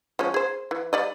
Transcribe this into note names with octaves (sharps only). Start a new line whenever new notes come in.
F3 G#3 C#4
G#4 C5
E3
G3 D5 D#5